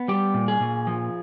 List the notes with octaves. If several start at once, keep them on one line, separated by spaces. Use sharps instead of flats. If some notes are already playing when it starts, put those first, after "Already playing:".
Already playing: B3
G3 G4
A#2
G#4
A#2
F3